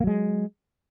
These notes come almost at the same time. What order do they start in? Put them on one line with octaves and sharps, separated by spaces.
A#3 F#3 G#3